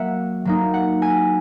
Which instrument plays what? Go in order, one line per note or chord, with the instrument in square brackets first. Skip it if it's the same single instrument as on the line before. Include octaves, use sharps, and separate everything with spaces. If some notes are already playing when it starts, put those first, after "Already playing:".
Already playing: [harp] F#3 A#3 E5 F#5
F#3 A#3 D#4
F#5
G#5